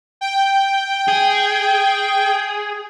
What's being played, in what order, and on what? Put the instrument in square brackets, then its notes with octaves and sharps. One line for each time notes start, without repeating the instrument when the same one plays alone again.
[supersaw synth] G5
[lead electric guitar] G#4